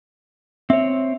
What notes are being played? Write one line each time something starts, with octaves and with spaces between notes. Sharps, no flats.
C4 C#5 E5